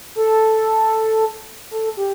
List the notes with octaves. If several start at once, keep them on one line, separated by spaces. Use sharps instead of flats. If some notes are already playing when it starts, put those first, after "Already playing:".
A4
A4
G4